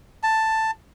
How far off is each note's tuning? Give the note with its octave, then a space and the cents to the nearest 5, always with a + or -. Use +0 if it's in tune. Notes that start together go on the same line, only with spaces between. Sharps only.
A5 +5